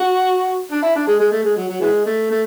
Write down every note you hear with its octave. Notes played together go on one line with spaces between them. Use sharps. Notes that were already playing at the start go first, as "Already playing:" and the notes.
Already playing: F#4
D4
E4
D4
G#3
G#3
A3
G#3
F#3
F#3
E3 G#3
A3
A3